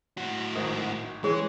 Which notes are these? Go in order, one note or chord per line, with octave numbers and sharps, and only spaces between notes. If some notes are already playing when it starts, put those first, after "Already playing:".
A2 F#4
G#1 D#3 D#5
E3 G#3 C#4 G#4